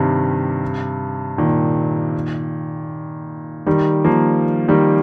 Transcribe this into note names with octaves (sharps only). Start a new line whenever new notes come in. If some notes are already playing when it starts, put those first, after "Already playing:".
Already playing: G2 C3 D#3 G3
A#2 D#3
D#3 G3
F3 A#3
D#3 G3